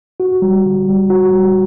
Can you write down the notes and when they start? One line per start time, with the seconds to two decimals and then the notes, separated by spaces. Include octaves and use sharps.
0.20 F#4
0.42 G3
0.65 D3
0.88 G3
1.10 F#4
1.32 G3